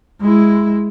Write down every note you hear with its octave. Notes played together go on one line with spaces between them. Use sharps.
G#3 E4